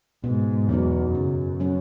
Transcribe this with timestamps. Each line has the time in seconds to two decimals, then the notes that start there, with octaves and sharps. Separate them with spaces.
0.24 G#2 B2
0.69 E2 F#3 B3 D#4 F#4
1.15 F#2 C#3
1.60 F#3 C#4 F#4